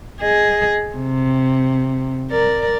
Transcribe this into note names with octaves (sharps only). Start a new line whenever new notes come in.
G#4 D#5
C3
A#4 D5